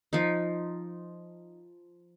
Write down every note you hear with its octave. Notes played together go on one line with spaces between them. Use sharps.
F3 D#4